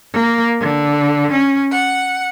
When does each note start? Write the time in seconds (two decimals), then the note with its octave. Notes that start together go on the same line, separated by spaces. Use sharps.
0.12 A#3
0.60 D3
1.32 C#4
1.72 F#5